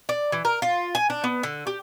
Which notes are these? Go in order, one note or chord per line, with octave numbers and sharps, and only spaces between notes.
D5
E3
A#4
F4
G#5
D4
B3
D3
G4